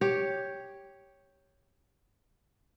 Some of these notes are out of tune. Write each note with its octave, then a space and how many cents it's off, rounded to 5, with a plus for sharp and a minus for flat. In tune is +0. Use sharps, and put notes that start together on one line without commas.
G4 +0 C#5 +0